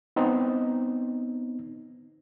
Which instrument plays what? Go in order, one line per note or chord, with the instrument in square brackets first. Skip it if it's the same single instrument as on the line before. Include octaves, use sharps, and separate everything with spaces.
[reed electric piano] B3 C4 D#4